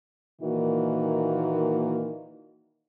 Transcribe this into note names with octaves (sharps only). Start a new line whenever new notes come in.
A#2 D#3 E3 A#3 F#4